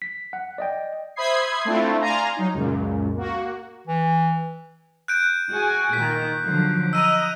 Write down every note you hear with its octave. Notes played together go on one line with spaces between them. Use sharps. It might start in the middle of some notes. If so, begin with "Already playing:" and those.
B6
F#5
D5 D#5 G5
C5 E5 B5 D#6 G#6 C7
A3 C4 D4 E4 F4
D5 F5 G#5 A#5 C6
F#3 D#4
C#2 F#2 A#2
A#3 F#4
E3
F#6 G6 D7
F#4 G#4 G#5
A#2 D#3 B6
D3 F3 F#3
D#5 A#5 D#6 E6 D#7